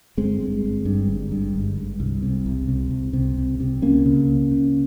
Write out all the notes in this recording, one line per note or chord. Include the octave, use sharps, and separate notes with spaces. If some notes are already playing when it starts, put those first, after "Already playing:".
G1 G#3 C4
G2
G1
G2
G1
G2
G1
G2
C2
C3
C2
C3
C2
C3
C2
C3
C#2 A#3 C#4
C#3
C#2
C#3